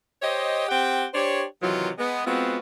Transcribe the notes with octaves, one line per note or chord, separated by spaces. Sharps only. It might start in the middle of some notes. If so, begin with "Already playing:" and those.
G4 C5 C#5 D#5
C4 G4 F#5 G5
D4 G4 C5 C#5
C3 D#3 E3 F#3 F4
G#3 B3
G#3 B3 C4 F4 F#4